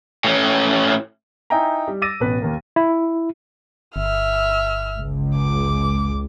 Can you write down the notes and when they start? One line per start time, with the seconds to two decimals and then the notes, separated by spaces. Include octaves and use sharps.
0.24 A2 C#4
1.50 D#4 E4 G5 G#5 A#5
1.88 G3
2.02 D6 E6 A6 A#6 D#7
2.20 A1 B2 B4
2.42 D#2 A#3
2.76 E4
3.96 G1 E5 F6
4.96 C#2
5.36 D6